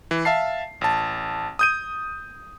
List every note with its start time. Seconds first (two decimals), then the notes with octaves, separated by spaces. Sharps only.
0.11 E3
0.25 E5 F5 A5 C7
0.81 A1 A5
1.59 D#6 G6 D#7